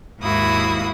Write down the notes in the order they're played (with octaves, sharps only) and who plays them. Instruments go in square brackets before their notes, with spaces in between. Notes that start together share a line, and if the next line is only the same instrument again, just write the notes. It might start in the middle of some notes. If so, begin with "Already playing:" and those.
[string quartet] D#2 G#2 A#3 E4 F#4 D#6